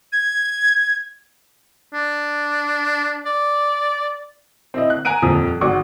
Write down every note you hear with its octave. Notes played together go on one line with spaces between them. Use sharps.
G#6
D4
D5
C4 E4 D#5
F#6
G#5 A#5 F#6 D7 D#7
D#1 F2 A#2 F3 D#6
G#1 F#4 C#6 D6